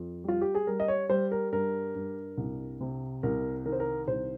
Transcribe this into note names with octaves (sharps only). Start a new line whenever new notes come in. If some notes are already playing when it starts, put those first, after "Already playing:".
Already playing: F2
G3 F4
G4
G#4
G3 A#4
D#5
C#5
G3 C5
A#4
G2 A#4
G2
C2
C3
C2 A#4
D#3 A#4
C5
A#4
C2 C5